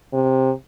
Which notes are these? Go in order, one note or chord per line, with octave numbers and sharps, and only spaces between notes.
C3